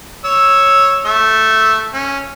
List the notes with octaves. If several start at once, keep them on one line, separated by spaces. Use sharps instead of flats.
C#5 E6
A3 E5
C#4